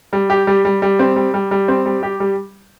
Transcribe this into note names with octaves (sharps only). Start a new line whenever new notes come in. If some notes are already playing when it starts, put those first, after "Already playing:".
G3
G4
G3
G3
G3
C4
G3
G3
G3
C4
G3
G4
G3